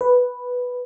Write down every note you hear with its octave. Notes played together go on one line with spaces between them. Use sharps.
B4